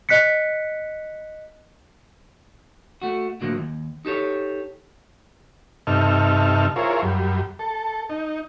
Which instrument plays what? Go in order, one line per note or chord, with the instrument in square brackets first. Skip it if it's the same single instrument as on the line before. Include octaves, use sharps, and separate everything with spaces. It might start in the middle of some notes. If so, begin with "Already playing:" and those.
[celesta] D#5 F#6 B6 C#7
[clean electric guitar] A3 F#4
A2 D3 F3 F#3 A#3
D#2
D#4 G4 A4 C#5
[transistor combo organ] G2 C3 D#4 A4 E5 F6
E4 F4 G#4 A#4 C5 C#5
F#2 G3
A4
D#4